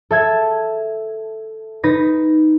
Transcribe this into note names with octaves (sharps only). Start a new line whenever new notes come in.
A4 E5 G#6
D#4 B4 A#6